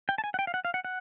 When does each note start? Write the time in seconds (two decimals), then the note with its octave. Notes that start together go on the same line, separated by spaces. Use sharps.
0.09 G5
0.18 A5
0.24 G#5
0.34 F#5
0.39 G5
0.47 F5
0.54 F#5
0.65 F5
0.74 F#5
0.85 F#5